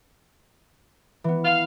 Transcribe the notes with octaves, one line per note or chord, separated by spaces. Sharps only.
E3 B3
F5